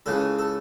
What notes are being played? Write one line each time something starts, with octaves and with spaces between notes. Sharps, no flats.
C#2 C#3 E3 A4
A4